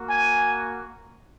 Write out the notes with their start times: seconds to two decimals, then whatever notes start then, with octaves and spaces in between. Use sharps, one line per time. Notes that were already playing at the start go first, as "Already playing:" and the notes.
Already playing: A#3 F#4
0.10 G#5